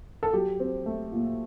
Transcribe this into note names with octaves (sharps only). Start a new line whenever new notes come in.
A4
F#3 G4
C4
A3
A#2